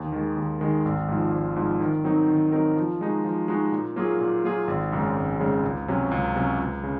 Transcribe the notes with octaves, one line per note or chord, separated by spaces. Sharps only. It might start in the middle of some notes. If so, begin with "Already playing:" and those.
Already playing: D#2
D#3 G#3
D#2
D#3 G#3
G#1
G#2 F3
G#1
G#2 F3
D#3
F#3 C4 D#4 A#4
D#3
F#3 C4 D#4 A#4
F3
G#3 D#4 F#4
F3
G#3 D#4 F#4
A#2
F#3 A#3 F4 G#4
A#2
F#3 A#3 F4 G#4
G#1
F#2 C#3 G#3
G#1
F#2 C#3 G#3
C#2
C3 F#3 C#4
C#2
C3 F#3 C#4
C#2
C#3